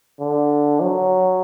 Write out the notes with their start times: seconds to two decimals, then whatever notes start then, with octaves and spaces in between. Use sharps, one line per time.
0.20 D3
0.81 F#3